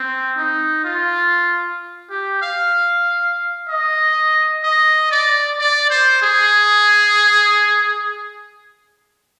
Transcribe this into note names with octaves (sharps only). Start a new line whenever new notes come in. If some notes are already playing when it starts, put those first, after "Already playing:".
Already playing: C4
D#4
F4
G4
F5
D#5
D#5
D5
D5
C5
G#4